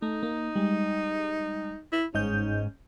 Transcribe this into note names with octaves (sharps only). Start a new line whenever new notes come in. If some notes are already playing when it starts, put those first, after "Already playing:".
A3 D#4
A#3
G3 G#3
E4
G1 G#2 C#4 D#5 G6